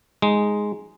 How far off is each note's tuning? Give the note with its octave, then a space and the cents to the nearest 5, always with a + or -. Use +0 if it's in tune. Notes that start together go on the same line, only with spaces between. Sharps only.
G#3 +0 D#4 +0